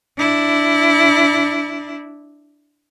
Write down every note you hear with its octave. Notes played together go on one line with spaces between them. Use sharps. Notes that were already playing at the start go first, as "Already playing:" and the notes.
D4 E4